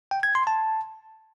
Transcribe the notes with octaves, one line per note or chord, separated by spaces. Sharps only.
G5
G#6
C6
A5